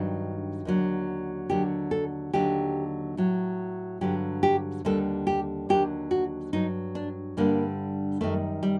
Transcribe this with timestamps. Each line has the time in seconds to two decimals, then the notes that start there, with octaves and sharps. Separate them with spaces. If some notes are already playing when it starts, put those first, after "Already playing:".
Already playing: G2 D#3 F#3 D4
0.65 D#2 D3 F#3
1.50 D#2 D3 F#3 G4
1.91 A4
2.33 D#2 D3 F#3 G4
3.17 A2 F#3
4.01 G2 D3 F#3 G4
4.43 G4
4.85 D#2 D3 G3 A4
5.27 G4
5.69 D#2 D3 F#3 G4
6.11 F#4
6.53 G2 F#3 D#4
6.95 D4
7.37 G2 D3 G3 A#3
8.21 F#2 D#3 G3 A3
8.63 G3